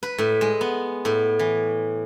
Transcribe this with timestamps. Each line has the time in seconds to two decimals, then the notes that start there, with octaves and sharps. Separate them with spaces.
0.03 B4
0.18 A2
0.41 G#3
0.61 B3
1.05 A2
1.39 E3